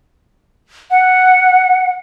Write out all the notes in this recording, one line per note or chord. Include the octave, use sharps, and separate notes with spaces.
F#5